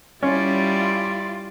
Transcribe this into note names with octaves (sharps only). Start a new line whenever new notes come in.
G3 C#4 E4 F4 D5